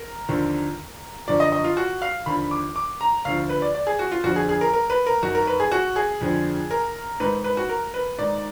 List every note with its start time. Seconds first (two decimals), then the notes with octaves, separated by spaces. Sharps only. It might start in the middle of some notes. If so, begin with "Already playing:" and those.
Already playing: A#4
0.28 D#2 D3 F3
1.28 F#2 D3 F3 D5
1.40 D#5
1.52 D#5
1.64 F4
1.77 F#4
2.02 F5
2.26 D#2 D3 F3 B5
2.51 D6
2.76 D6
3.01 A#5
3.25 D2 D3 F3 F5
3.49 B4
3.62 D5
3.75 D5
3.87 G#4
3.99 F#4
4.11 F4
4.24 F2 D3 F3 F#4
4.36 G#4
4.49 G#4
4.61 A#4
4.73 A#4
4.90 B4
5.06 A#4
5.23 F#2 D#3 F#4
5.35 A#4
5.47 B4
5.60 G#4
5.72 F#4
5.96 G#4
6.21 F2 D3 F3
6.71 A#4
7.20 G#2 D#3 B4
7.44 B4
7.57 F#4
7.69 A#4
7.94 B4
8.18 G#2 D#3 D5